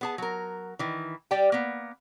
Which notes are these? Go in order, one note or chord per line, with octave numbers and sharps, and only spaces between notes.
B3 G#4 A5
F#3 A#4
D#3 E3
G3 G4 D5 G5
A#3 B3